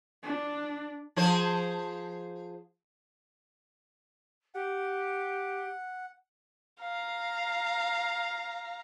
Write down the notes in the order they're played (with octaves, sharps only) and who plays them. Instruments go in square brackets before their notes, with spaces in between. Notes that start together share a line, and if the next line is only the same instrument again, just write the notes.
[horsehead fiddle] D4
[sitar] F3 G#4 C5
[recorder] G4 [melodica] F#5
[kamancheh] F5 A#5